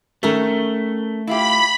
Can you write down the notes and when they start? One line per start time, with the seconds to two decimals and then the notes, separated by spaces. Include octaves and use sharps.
0.23 D#3 A3 C#4 A4 A#4
1.27 E4 F4 G4 B5